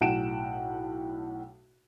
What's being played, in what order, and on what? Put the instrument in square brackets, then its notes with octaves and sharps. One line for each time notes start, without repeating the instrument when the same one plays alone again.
[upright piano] B1 A2 F#5 G5 D7 E7